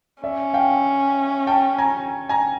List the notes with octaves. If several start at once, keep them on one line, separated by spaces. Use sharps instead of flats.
C#4 D5 E5
F5 G5
G5 A5
G#5 A#5
G#5 A#5